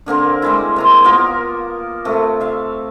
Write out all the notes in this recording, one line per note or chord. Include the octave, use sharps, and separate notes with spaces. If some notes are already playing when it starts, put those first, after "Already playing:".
D3 A#3 C4 A#4
G3 G#3 E4
C3 A#5 C6
A#3 B3 F4 A#4
C3 A3
E5 F5